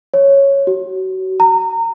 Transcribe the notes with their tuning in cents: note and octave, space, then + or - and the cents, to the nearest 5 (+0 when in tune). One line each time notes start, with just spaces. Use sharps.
C#5 -5
F#4 +30
A#5 -25